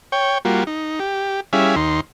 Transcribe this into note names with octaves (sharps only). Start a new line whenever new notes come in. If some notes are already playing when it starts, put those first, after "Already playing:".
C#5 G5
G3 A#3 F4 F#4
D#4
G4
G3 C#4 E4 G#4 E5 F5
D#2 D#4 C6